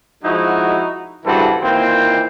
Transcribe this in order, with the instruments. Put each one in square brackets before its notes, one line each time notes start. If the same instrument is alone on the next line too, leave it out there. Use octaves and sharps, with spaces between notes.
[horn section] F3 G#3 D#4 E4 F#4
G2 C#3 E3 F#4 A4 C5
A#2 D#3 E3 A#3 C4